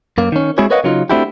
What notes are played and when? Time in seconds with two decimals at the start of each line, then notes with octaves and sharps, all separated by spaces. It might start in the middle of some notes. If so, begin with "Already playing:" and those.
0.18 F#2 A#3
0.32 D#3 C#4
0.58 G#3 C4 E4 F#4 G#4 C#5
0.70 A#4 B4 C#5 D#5 F5 F#5
0.84 C#3 F#3 D#4 F4
1.09 A3 C4 D4 E4 F#4 G4